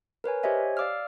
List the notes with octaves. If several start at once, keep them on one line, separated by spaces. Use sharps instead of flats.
A#4 B4 C#5 G#5
G4 C5 C#5 D#5 E5 G#5
D5 F5 D6 E6 F6